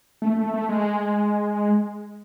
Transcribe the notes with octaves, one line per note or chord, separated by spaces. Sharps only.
A3
A3
A3
G#3